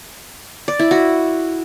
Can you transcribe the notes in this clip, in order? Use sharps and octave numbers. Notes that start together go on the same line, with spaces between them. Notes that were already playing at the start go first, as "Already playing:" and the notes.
D5
E4
F#4